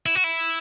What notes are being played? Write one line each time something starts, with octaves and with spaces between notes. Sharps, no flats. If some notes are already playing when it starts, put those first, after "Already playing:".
E4
F#4
E4